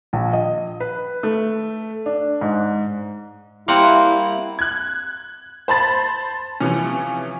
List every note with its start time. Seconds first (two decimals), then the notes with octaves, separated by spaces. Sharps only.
0.13 A#1
0.33 D#5
0.80 B4
1.23 A3
2.06 D4
2.41 G#2
3.68 G3 A#3 C4 E4 F#5
4.59 F#6 G#6
5.68 C5 A5 B5 A6
6.60 C3 E3 F3 C#4